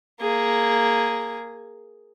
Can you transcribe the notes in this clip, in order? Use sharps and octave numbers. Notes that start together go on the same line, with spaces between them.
A#3 G#4